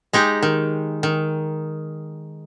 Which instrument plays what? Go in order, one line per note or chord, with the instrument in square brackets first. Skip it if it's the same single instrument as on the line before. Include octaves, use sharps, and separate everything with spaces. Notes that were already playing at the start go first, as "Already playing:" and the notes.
[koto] G#3 D#4 G4
D#3
D#3